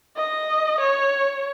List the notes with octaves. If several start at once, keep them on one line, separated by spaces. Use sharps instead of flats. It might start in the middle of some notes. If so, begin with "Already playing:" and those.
D#5
C#5